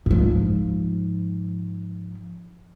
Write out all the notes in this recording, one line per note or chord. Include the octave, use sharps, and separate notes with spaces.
G#2 F3